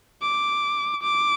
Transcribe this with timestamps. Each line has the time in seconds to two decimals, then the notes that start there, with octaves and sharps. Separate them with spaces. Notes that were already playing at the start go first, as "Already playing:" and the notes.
0.22 D6
1.03 D6